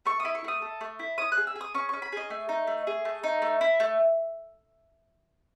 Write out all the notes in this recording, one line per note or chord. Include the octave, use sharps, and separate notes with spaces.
A3 C#6
E4 D#6
C#6
A3 D#6
A4
A3
E4
C#4 D#6
F#6
G#4
E6
G#4
D#6
C#4 C#6
C#4 C#6
B5
G#4 D#5
A3
D#4
A3
G#4
A3
D#4
A3
E4
A3